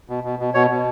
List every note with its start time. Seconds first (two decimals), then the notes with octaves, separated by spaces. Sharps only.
0.09 B2
0.24 B2
0.39 B2
0.54 B2 C#5
0.70 B2